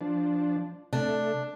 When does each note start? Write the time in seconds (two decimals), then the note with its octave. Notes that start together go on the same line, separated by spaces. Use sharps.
0.01 F3 D4
0.93 C3 A3 D4